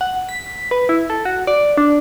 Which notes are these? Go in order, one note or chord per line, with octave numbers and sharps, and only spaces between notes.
F#5
B6
B4
E4
A4
F#4
D5
D4